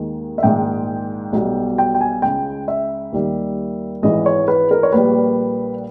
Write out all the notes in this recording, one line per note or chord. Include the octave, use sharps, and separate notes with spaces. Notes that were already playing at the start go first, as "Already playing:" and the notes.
Already playing: D#2 D#3 G#3
E5
A#1 G#2 D#3 G#3 G5
B1 B2 G3
G5
G5
G#5
C#2 C#3 G#3 G5
E5
D#2 D#3 G3
G#1 G#2 E3 D#5
C#5
B4
A#4
C#5
A#1 A#2 G3 B4